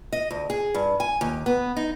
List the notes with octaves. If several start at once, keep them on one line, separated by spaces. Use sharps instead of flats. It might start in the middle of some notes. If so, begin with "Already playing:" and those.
D#5
D2
G#4
G2
G#5
D#2
B3
D#4